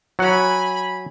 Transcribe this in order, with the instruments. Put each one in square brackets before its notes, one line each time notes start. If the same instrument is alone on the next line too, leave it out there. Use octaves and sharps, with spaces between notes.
[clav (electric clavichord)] F#3 F#5 [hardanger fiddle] G#5 B5